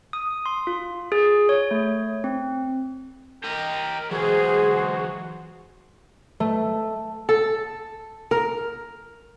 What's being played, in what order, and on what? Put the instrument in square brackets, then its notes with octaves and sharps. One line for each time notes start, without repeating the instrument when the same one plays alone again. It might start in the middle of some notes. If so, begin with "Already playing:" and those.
[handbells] D#6
C6
F4
G#4
C#5
A3
C4
[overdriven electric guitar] G4 D#5 [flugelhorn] A#4
[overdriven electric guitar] E3 F#3 [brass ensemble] G#3 C5 [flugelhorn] F#4 [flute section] G#4
[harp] A3
[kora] A4
A#4